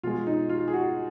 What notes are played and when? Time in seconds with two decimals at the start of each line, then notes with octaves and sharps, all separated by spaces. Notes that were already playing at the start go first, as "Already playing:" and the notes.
0.03 B2 G#3 F4
0.27 D#4
0.49 F4
0.68 G#4
0.73 F#4